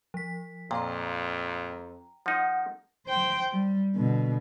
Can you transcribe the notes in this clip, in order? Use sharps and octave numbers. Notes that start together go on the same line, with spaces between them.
F3 B6
F2 A#2 G5 A#5
F3 D#4 F#5
C5 G5
G3
B2 D3